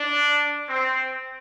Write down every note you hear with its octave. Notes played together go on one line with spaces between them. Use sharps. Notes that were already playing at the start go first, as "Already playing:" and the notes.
Already playing: D4
C4